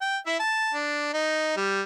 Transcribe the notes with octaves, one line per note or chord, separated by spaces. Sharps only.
G5
E4 E5
A5
D4
D#4
G3